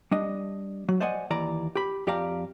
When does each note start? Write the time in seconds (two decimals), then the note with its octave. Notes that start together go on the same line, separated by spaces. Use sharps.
0.11 G3 D4 D#5
0.89 F#3
1.00 C5 D5 D#5 F#5 G#5
1.30 D#2 E3 D5 A#5
1.75 G4 B5
2.07 F2 G4 D5 F5 A#5